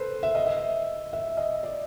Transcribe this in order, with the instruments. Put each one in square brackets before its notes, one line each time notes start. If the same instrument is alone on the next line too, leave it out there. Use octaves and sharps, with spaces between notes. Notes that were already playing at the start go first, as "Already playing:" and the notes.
Already playing: [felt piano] A4 B4 C5
E5
D#5
E5
E5
D#5
D5